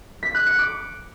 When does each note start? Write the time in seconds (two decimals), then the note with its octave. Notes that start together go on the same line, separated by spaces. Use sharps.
0.23 B6
0.35 F#6
0.47 C#7
0.59 D6